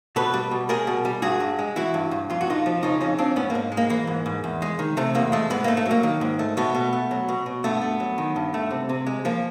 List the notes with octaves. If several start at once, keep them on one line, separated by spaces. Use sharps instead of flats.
B2 A4 B4
G3
B2
G3 G#4 A#4
B2
G3
G2 F#4 G#4
G2
G#3
E3 E4 F#4
G2
G2
F2 F4
F#4
F2 D#4 F4
F3
C#3 D#4 F4
F2 C#4 D#4
F2 C4 D4
G#2 B3 C#4
A#3
G#2
G#3
A#3
E3 A#3
G#2
G#2
E2
G#3
D#3
C3 A3
E2 A#3
G#3 A3
G#2 B3
A3 A#3
A3
F#3
A#3
D#3
G#2
A3
B2 A3 B3
B2
A3
F#3
B2
B2
G2 A3 B3
A3
F#3
D#3
G2
A3
C3
C3
G#3
F3 A#3